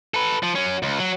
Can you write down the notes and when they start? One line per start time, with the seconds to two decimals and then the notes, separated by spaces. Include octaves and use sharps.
0.14 A4 B4
0.43 F3
0.55 F#3 C#4
0.83 C#2
0.99 F#3